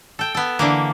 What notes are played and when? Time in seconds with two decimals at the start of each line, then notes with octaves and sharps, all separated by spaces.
0.19 A4 G5
0.35 B3 A4
0.59 D3 E3 A#3